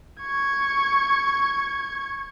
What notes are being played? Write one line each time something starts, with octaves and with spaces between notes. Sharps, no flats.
C#6 G#6